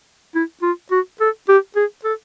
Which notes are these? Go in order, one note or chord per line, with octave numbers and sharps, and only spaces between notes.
E4
F4
F#4
A4
G4
G#4
A4